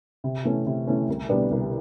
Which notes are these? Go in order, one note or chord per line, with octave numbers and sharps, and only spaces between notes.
C3
E3 A3 C#4
C3
E3 A3 C#4
C2
B2 G3 B3 D4
C2